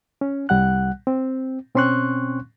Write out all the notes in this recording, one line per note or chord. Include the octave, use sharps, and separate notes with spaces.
C#4
C2 G3 F#5 F#6
C4
B2 C4 C#4 C6 C#6 F#6